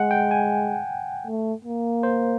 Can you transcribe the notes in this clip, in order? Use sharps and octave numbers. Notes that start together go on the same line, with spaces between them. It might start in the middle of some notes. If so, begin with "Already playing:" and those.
Already playing: G#3 F#5
G5
G#5
A3
A#3
C5